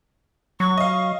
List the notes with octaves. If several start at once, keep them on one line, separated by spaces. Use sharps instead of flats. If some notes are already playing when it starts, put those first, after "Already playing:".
F#3 C#6
D#5 F5